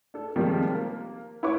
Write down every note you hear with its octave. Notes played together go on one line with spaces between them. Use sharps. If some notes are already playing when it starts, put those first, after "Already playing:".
D4 A4
C3 D#3 F3 G3 G#3 A#3
A#3
E4 F4 B4 C#5 C#6 D6